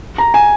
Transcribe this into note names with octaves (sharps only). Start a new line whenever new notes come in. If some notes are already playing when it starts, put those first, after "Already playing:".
A#5
G#5